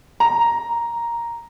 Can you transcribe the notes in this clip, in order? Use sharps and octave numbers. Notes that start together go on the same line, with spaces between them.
A#5